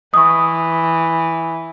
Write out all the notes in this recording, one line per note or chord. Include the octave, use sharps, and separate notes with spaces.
E3 C#6 D#6